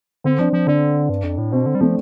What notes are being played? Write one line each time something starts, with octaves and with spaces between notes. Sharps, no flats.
D3 C4
F3 D4
F3
D3 D4
G2
F2
A2
B2 C4
D3
G3
F3 A3